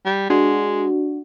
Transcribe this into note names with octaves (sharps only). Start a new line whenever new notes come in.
G3
G#3 D4 F#4